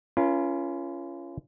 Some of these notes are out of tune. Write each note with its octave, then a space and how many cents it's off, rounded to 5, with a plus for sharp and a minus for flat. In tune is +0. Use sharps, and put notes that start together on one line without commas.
C#4 +10 F4 -35 A#4 +45